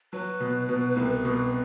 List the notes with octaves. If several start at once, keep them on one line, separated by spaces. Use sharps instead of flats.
F#3 B4
B2
B2
C2
B2